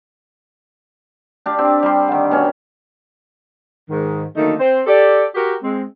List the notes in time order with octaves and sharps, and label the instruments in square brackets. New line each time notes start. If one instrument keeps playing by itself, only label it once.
[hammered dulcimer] D4 G4 F5
C4 G4
G3 C6
D3 D#3
B2 C#4
[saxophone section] G#2 D#3
D3 D#3 F#3 A3 A#3 D#4
C4 C5
G4 A4 D5
F#4 G4 A#4
G#3 C4